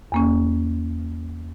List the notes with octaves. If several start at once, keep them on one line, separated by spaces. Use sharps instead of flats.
E2 A#3 C#4